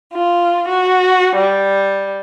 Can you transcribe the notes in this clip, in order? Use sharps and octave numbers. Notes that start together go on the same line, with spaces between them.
F4
F#4
G3